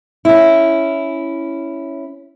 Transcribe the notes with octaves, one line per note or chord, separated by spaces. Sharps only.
C#4 E4